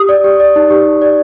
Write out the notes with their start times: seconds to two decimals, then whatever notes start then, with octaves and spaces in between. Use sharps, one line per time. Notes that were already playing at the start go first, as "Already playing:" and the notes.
Already playing: G4 D#6
0.09 D5
0.24 G4
0.40 D5
0.56 D#4
0.70 G4
0.87 D#4
1.02 D5